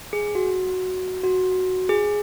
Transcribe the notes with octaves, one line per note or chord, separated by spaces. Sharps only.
G#4
F#4
F#4
G#4